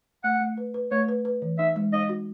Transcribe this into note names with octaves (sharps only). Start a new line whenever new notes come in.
A3 F#5
A3
B4
B4
A3 C#5
B4
B4
E3
D#4 E5
G#3
D#4 D#5
F#4